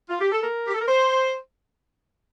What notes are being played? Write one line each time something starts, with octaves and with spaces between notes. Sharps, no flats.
F4
G4
A4
A#4
G4
A4
A#4
C5